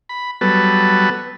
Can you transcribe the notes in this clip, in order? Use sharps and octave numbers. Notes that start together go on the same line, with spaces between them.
B5
F#3 G3 B3 A4 B4